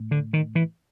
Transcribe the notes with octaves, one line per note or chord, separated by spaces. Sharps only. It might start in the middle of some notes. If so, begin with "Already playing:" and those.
Already playing: A2
D3
D#3
E3